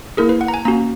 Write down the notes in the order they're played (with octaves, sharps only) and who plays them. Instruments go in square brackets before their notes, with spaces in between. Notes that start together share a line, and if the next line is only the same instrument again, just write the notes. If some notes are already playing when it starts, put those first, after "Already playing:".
[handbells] A#3 E4 G#4 A#4
B4
F#5
A#5
G#5
A#3 C#4 F#4 A#5